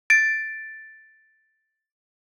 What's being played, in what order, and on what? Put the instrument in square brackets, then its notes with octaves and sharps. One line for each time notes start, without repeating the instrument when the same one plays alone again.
[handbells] A6 D7